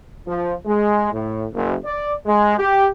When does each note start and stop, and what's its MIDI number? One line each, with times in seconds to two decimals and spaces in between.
0.27 0.53 53
0.65 1.11 56
1.13 1.44 45
1.52 1.74 30
1.84 2.14 74
2.26 2.55 56
2.58 2.86 67